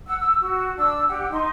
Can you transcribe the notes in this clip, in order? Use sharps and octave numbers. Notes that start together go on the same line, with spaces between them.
F#5 E6
E6
F#4
D4 E6
G4 F#5
D#4 C6